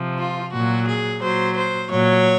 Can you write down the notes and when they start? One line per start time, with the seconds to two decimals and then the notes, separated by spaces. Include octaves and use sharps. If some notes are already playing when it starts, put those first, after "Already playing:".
Already playing: C3 F3
0.19 F4
0.53 A#2 F#3 F#4
0.87 G#4
1.22 A#2 F#3 C5
1.56 C5
1.90 A#2 F#3 C#5